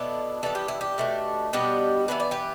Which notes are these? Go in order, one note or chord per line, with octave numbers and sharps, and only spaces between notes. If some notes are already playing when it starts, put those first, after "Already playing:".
Already playing: B2 B3 D4 E4 A4
E3 G3 B3 D4 A4
G4
E4
G4
B2 A3 D4
B2 G3 B3 D4 G4
E3 G3 B3 D4 B4
D5
G4 B4